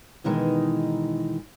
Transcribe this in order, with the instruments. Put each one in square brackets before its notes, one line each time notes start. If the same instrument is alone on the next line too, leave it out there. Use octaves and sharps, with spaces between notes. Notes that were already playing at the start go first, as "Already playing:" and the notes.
[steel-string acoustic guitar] B2 D#3 E3 G#3 D#4